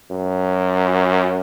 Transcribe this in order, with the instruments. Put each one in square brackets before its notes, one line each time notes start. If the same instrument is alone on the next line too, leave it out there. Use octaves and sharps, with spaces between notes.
[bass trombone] F#2